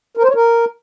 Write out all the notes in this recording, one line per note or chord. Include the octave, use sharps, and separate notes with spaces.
A#4
C5
C#5
A#4